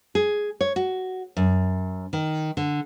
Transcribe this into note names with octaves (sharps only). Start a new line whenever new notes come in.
G#4
C#5
F#4
F#2
D#3
D3